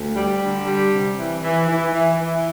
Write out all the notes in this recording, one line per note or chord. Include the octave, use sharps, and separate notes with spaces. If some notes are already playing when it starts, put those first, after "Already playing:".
Already playing: D2
G3
D3
G3
C3
E3
E3
E3
E3
E3